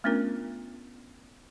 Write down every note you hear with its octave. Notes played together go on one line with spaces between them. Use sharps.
A3 B3 C#4 D4 F4 A#4